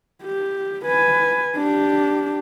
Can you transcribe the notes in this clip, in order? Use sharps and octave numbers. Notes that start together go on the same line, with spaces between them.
G4
B4 G#5
D4 G4